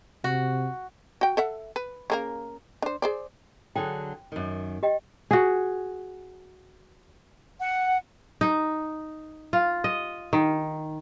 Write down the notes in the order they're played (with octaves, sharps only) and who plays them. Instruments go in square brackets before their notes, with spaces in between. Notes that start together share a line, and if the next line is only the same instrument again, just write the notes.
[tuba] C3 [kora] F#4
[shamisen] F#4 G5
A4 E5 F#5
B4
C#3 A#3 A#4
D4 C5
G#4 C5 D5
[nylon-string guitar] D3 F#3 G#4 [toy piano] G5
[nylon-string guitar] F#2 D#3
[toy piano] G4 D#5 G5
[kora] F#4 G#4
[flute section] F#5
[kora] D#4
F4
D#5
D#3